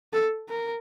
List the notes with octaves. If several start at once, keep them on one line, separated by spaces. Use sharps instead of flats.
A4
A#4